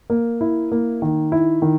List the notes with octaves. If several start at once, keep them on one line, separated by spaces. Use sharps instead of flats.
A#3
E4
A#3
D#3
E4
D#3